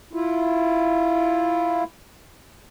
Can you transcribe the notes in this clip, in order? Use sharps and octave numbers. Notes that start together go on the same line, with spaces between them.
E4 F4